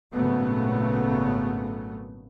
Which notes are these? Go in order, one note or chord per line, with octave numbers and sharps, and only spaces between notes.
G#1 A#2 C#3 F#3 A3 B3